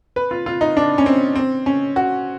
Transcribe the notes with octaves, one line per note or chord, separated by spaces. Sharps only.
B4
F4
F4
D#4
D4
C#4
C4
C4
C#4
F#4